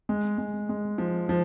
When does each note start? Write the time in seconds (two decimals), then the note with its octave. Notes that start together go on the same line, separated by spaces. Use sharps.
0.09 G#3
0.38 G#3
0.69 G#3
0.98 F3
1.29 F3